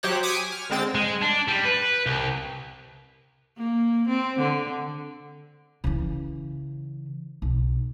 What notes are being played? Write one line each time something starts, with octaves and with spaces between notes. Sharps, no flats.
F#3 G4 C5 C#5 F#6
D6 D#6 G#6 B6 C#7 D#7
G#5
F6
D3 G#3 C4 G5 A6
G#3
D4
G3
B4
C2
A#3
C4
D3
C#3 E3
B1